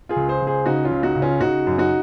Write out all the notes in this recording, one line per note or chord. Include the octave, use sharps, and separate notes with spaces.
F4 G#4
C#2
G#4 C5
C#2
G#4 C5
C#3 D#4 F#4
C#4 F4
C#2
D#4 F#4
C#3
C#4 F4
C#3 D#4 F#4
F#2
D#4 F#4